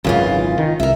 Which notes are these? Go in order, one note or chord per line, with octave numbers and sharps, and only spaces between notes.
G#1 C#2 F#2 C#3 E3 F4
D#3
C2 A#4 E5